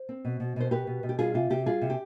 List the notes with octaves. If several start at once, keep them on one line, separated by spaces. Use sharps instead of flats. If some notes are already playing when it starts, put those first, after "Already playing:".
Already playing: C5
C4
B2
B2
B2 C5
B2 G4 B4
B2
B2
G4
G3 F4 G#4
C3 F4
C3 G4
G3 F4 G#4
C3
G4